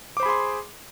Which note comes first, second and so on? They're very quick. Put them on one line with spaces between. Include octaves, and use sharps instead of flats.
D6 C5 B5 G#4 C6